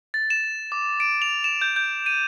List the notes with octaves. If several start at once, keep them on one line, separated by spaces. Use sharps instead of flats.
A6
E7
D6
D7
F7
E7
G6
G6
D#7